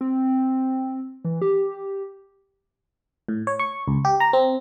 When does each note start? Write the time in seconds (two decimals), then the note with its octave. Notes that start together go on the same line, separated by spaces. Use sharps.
0.01 C4
1.25 E3
1.42 G4
3.28 A2
3.47 C#5
3.59 C#6
3.88 C#2
4.05 G4
4.20 A#5
4.33 C4